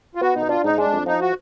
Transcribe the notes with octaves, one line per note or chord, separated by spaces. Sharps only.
F4
B3 F#4
B2 D#4
D4 F4
G#2 D#4
G#3 D4
F2
F3 D#4
F#4